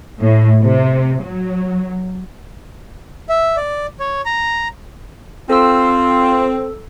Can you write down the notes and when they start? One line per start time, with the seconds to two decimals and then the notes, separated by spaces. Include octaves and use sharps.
0.19 A2
0.63 C3
1.23 F#3
3.29 E5
3.57 D5
4.00 C#5
4.25 A#5
5.50 C4 F4 A4 E6